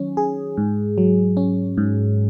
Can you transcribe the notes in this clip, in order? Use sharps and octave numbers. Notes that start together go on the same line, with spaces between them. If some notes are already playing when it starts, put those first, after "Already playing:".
Already playing: D#3 F#3 C#4
G#4
G#2
F#3
C#4
G#2